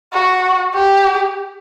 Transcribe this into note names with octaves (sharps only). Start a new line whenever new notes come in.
F#4
G4